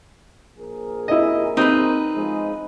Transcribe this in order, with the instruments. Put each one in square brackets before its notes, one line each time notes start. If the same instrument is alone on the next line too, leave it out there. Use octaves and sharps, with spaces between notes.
[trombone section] A#1 G#4 A#4
[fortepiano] E4 D#5
[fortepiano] C4 [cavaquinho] D#4 B4
[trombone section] F3 G#3